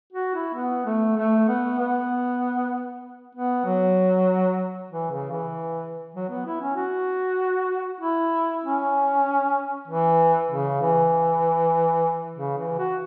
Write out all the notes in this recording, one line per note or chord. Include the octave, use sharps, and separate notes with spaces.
F#4
E4
B3
A3
A3
B3
B3
B3
F#3
E3
C#3
E3
F#3
B3
E4
C#4
F#4
E4
C#4
E3
C#3
E3
C#3
E3
F#4